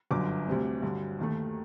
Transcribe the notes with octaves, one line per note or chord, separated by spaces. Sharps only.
G1 F#2 D3 D6
D2 C3 G3 C4
G2 D3 F#3
D#2 D#3 A3